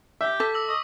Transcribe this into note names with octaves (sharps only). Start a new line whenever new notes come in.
G4 E5
A4 D6 B6
E6 A#6 F#7
D#5 C#6